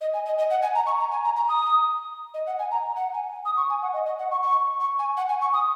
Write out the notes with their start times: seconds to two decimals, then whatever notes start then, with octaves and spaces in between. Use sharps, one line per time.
0.01 D#5
0.13 G#5
0.25 D#5
0.38 D#5
0.50 F#5
0.62 G#5
0.75 A#5
0.86 C#6
0.99 A#5
1.11 G#5
1.24 A#5
1.36 A#5
1.48 D#6
2.34 D#5
2.46 F#5
2.59 G#5
2.71 A#5
2.96 F#5
3.14 G#5
3.45 D#6
3.57 C#6
3.69 G#5
3.82 F#5
3.93 D#5
4.06 D#5
4.19 F#5
4.31 C#6
4.43 C#6
4.80 C#6
4.99 G#5
5.17 F#5
5.29 G#5
5.41 C#6
5.53 D#6